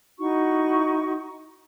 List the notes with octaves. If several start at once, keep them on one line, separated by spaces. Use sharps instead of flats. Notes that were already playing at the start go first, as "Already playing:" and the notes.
D#4 E4 F#4 C#6